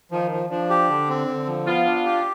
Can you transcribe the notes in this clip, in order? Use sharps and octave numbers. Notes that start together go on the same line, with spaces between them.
D#3 F3
F3
F3 D4
G4
D3
C4
D3
F3
B3 F4
D4
G4